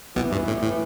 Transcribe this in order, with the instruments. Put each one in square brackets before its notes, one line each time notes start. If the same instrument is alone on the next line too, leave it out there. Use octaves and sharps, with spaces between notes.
[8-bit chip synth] B1 B2 [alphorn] E3
[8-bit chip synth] G2
A2
A2